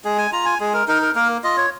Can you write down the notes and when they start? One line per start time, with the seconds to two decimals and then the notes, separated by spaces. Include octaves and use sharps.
0.05 G#3 G#4
0.18 G#5
0.32 F4 A#5
0.46 G#5
0.60 G#3 G#4
0.74 A#4
0.88 D#4 A#4
1.02 A#4
1.15 A#3 A#4
1.44 F4 D#5
1.57 C#5